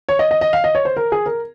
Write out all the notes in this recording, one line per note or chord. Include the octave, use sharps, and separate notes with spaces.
C#5
D#5
D#5
D#5
F5
D#5
C#5
C5
A#4
G#4
A#4